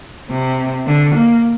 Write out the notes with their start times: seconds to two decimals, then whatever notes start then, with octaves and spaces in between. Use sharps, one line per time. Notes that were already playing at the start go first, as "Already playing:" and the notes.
0.31 C3
0.87 D3
1.15 A#3